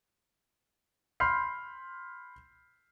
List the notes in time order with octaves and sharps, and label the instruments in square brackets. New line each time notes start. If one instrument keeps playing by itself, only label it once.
[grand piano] B5 C6 F6 G6 C7